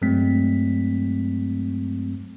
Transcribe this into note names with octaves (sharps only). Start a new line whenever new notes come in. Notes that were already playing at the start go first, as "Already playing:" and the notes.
G2 F#3 G#3 A3 C4 B6